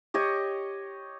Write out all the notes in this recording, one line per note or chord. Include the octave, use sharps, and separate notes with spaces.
G4 C#5 D#5